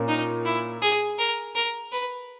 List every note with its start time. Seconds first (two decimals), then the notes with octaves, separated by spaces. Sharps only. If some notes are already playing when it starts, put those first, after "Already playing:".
Already playing: A#2 A#3 C#4
0.08 D#4
0.45 E4
0.82 G#4
1.19 A#4
1.55 A#4
1.92 B4